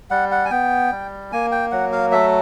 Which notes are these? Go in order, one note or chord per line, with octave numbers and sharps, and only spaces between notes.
G3 F#5
F#5
G#5
B3 G5
G3
A#3 G#5
G5
F#3 F#5
F5
A3 E5